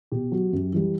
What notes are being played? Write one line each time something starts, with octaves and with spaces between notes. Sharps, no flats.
B2 G4
F#3
F#2
E3 G3